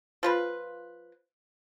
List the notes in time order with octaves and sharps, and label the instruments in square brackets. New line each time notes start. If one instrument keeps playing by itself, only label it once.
[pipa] F3 F4 B4